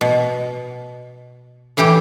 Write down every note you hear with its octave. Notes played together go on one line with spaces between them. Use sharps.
B2
A2 E3 E4 G4 G5